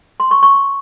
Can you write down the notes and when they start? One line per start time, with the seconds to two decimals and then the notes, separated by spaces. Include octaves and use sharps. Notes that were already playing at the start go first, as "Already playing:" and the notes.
0.20 C6
0.31 C#6
0.43 C#6